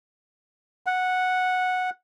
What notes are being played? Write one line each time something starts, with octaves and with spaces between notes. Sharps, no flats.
F#5